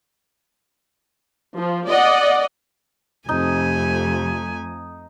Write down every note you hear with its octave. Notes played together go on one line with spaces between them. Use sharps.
F3
D5 D#5 F#5
F2 C3 A3 D#4 G#5